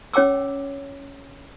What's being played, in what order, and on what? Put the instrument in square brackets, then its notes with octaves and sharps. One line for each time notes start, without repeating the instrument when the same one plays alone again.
[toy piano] C#4 C#5 G5 D6 E6